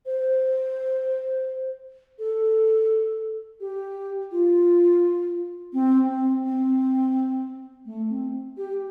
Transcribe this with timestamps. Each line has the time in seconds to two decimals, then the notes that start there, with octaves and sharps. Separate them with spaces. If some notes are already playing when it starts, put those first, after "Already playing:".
0.06 C5
2.19 A4
3.60 G4
4.32 F4
5.73 C4
6.08 C4
6.44 C4
7.85 A3
8.09 C4
8.57 G4